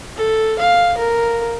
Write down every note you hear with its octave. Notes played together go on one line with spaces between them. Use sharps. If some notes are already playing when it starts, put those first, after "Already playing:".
A4
F5
A#4